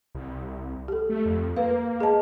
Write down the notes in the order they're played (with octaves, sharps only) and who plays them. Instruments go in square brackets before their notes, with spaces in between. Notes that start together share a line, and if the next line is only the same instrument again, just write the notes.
[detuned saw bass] C2
[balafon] G4 A4
[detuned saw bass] A3
F2
[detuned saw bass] A#3 [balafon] B4 F5
[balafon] G#4 D#5 A5